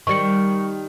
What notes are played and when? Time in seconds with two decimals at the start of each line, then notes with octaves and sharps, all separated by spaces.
0.07 D#3 G3 C#6 C#7